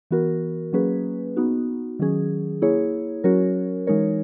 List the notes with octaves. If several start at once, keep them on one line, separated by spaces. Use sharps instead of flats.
E3 B3 F#4 A#4
F#3 A#3 C#4 G#4 B4
B3 D#4 F#4
D#3 F#3 C#4 G#4
A#3 E4 G#4 C#5
F#3 C#4 F#4 A#4 C#5
E3 G#3 D#4 A#4 C#5